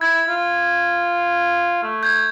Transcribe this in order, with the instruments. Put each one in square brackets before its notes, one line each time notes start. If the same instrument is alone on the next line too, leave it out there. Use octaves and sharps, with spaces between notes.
[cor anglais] E4 [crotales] G#6
[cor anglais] F4
A3
[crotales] G6 G#6